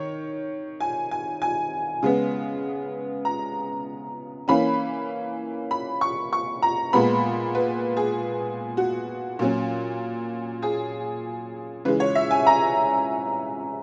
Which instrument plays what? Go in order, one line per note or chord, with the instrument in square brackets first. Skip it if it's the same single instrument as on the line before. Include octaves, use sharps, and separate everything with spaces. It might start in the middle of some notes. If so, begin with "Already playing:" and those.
Already playing: [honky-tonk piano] D#3 C#5
G#5
G#5
G#5
C#3 G#3 B3
A#5
E3 A#3 C#4 B5
B5
C#6
C#6
A#5
A#2 G#3 B3 B5
B4
G#4
F#4
A#2 F#3 C#4
G#4
C#3 E3 G#3 B4
C#5
E5
G#5
A#5